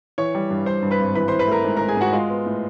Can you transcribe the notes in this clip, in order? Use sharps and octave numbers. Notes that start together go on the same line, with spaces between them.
E3 C#5 C#6
G3
G2
G2 C5 C6
G2
B4 B5
G#1
E3 B4 B5
E3 C5 C6
B4 B5
A3 A#4 A#5
G#2
G#2 A#4 A#5
G#4 G#5
G#2 F#4 F#5
G#3 F4 F5
B3
A2